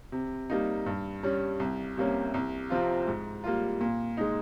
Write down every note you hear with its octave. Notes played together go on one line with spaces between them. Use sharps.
C3
G3 A#3 D#4
G2
G3 C#4
C2
C3 G3 A#3 C#4
C2
C3 F3 C4 F4
G#2
G3 A#3 F4
A#2
G#3 D#4